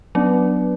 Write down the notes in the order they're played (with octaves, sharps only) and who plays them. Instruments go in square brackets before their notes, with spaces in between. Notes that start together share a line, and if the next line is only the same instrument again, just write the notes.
[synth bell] F#3 [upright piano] B3 D4